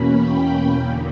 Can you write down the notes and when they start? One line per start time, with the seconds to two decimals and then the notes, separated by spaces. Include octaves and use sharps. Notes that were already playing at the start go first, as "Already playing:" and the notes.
Already playing: E2 B2 A#3 C#4 B5
0.17 G5
0.77 E2 D3 A#3